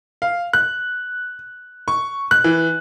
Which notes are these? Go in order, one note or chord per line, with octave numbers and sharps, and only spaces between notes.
F5
F#6
C#6
F#6
E3